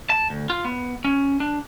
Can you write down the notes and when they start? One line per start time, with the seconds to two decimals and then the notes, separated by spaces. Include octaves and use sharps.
0.10 A5
0.30 D2
0.50 F4
0.65 B3
1.04 C#4
1.40 D4